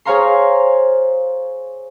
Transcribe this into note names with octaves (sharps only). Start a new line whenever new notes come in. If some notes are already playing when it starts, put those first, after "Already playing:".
G#4 C5 C#5 F5 A#5 C6